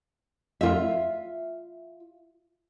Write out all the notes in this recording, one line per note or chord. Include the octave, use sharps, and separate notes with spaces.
F4 E5